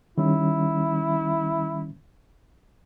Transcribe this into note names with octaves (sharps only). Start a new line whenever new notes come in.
D#3 G3 C#4 E4